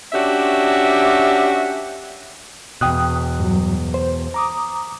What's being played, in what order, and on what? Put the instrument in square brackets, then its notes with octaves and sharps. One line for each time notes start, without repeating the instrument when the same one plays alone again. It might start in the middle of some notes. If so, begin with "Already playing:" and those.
[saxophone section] C#4 D4 F#4 G4 E5
[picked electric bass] E2 B2 [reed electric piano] G5 D#6 F#6
[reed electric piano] G2 F#3
C5
A#5 D6 D#6